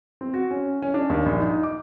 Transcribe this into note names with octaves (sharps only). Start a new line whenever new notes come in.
C4
F#4
C#4
C#4
D4
D#2
A#1
D#4
D6